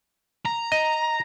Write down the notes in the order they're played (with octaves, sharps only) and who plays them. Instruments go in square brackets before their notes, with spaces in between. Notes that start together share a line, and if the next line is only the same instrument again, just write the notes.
[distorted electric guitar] A#5
[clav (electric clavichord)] D#5